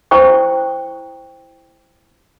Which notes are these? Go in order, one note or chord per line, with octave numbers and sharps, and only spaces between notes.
E4 C5 G5 C#6